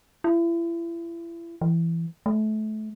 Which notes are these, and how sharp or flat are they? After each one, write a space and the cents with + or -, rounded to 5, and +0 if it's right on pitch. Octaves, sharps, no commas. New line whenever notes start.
E4 +35
E3 +15
A3 -30